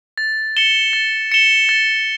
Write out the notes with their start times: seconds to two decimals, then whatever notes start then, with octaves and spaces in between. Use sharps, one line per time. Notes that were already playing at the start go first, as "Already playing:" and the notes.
0.18 A6
0.57 C#7 E7 G7
0.93 A6
1.32 C#7 E7 G7
1.69 A6